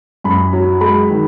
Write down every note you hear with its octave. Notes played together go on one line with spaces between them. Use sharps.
F#2 B5
F#3
G#3 B5
D#3